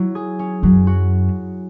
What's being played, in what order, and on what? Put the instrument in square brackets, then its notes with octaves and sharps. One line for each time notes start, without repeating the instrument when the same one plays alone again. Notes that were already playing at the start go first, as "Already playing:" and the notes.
Already playing: [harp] F#3 E4
G#4
C#4
[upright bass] F#2 [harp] F#3
[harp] F#4